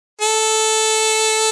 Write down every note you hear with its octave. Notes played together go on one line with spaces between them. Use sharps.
A4